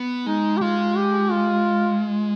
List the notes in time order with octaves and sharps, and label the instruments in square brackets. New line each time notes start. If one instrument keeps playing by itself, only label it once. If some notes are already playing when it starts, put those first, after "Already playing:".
Already playing: [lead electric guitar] B3
[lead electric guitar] G#3 [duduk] D#4
[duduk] G4
[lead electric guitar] G#3 [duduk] F4
[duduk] G4
F4